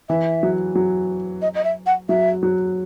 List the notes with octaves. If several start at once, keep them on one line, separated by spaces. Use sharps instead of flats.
E3 E5
F#3
F#3
D#5
D#5
E5
F#5
F#3 E5
F#3